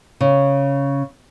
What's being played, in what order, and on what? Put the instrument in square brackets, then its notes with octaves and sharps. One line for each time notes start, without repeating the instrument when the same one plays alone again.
[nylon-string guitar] C#3